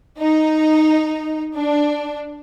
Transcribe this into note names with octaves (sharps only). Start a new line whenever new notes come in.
D#4
D4